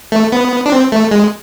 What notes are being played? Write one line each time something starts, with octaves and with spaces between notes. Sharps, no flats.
A3
B3
D4
C4
A3
G#3